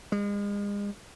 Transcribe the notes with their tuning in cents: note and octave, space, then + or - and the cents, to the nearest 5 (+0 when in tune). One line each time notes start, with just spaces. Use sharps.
G#3 -35